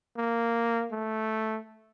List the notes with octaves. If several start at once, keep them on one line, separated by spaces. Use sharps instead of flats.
A#3
A3